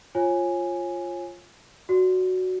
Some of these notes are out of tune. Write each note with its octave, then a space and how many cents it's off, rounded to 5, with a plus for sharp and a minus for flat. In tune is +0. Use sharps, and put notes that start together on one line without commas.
F4 +0 C#5 -30 G#5 +0
F#4 +0 D5 +0